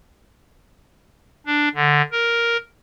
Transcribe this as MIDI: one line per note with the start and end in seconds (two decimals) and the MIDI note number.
1.46 1.69 62
1.75 2.02 50
2.12 2.57 70